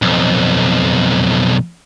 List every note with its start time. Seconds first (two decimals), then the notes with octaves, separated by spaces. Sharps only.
0.02 B1 F2